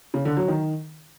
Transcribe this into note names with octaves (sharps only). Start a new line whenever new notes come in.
C#3
D3
F#3
D#3